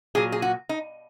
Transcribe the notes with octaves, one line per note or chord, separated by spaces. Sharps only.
A#2 F#3 G#4
G#4
F#4
D#4